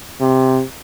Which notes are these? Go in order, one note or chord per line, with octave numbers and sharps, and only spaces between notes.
C3